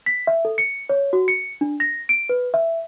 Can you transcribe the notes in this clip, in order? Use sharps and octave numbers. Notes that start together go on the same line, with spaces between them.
B6
E5
A4
C#7
C#5
F#4
C#7
D4
A#6
D7
B4
E5